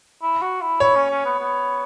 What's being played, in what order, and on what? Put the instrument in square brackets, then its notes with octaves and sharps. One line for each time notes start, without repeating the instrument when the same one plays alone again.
[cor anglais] E4
F#4
E4
[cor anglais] E4 [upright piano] C#5
[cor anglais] C#4
C#4
B3
B3